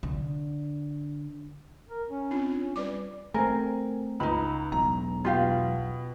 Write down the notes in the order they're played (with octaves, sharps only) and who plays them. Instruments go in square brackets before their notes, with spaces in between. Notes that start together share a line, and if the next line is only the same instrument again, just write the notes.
[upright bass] D3
[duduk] A#4
C#4
[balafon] C4 D4 F4
[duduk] C#4
[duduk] G3 [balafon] B4 D5 D6
[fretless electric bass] A3 A#3 C4 [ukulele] A#4 [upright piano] G#5
[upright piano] C#2 [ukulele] D#4 B5
[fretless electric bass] E1 B1 [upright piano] A#5
[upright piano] B2 [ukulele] F4 G4 F5